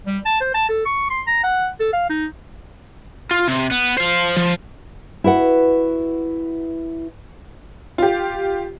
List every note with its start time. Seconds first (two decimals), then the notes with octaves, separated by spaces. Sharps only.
0.07 G3
0.26 A5
0.41 C5
0.54 A5
0.69 A4
0.86 C#6
1.11 C6
1.27 A#5
1.44 F#5
1.80 A4
1.93 F5
2.10 D#4
3.31 F4
3.48 C3
3.71 B3
3.98 C5 F5
4.37 F3
5.24 E4 F#4 B4 F#5
7.98 F4 G4